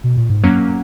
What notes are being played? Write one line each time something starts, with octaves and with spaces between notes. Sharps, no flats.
B2
A#2
G#2
F#2 F#3 A#3 C#4